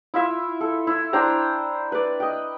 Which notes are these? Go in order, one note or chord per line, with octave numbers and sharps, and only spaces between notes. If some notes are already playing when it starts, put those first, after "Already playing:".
E4 F4 E5
A4
E4
D4 C5 G5 A#5
B4 D5
D#5 G5